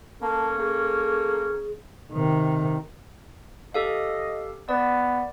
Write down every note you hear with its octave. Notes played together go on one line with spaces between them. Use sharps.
A#3 C#4 A4 A5
A#3 G#4
C3 D#3
G4 A4 D#5 F5
B3 D5